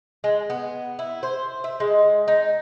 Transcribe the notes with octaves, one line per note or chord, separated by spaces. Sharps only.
G#3
B3
E4
C5
E5
G#3
D#4